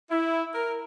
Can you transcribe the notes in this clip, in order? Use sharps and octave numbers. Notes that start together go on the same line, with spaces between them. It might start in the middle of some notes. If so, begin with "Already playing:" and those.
E4
A#4